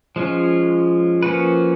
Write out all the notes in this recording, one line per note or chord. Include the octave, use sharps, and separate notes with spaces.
F3 G#3 C#4 F4
F3 A#3 C#4 F#4 B4